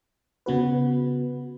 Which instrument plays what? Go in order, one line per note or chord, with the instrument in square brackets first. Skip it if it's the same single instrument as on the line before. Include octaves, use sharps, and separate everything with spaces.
[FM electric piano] C#3 B3 F#4 B4